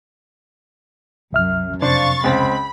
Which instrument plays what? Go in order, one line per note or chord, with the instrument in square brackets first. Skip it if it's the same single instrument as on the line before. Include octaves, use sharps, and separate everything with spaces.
[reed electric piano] C2 E5 F6 [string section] F#2
[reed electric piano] F2 C3 [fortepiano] D4 C5 [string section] F5 C#6 A6
[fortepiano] C#2 C4 [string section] B5